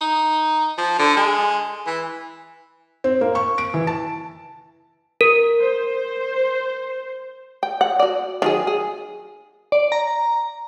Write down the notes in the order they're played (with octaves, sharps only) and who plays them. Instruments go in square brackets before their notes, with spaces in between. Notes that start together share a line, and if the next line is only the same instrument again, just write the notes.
[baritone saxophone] D#4
F3
D3
G#3
E3
[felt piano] C4
A#3
C#6
D7
E3
A5
[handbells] A#4
[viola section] C5
[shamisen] G5
F#5
F#4 D5
D#3 F#3 G#4
G#4
[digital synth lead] D5
A#5